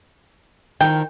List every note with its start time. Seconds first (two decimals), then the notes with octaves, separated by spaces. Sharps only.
0.81 F2 D#3 G5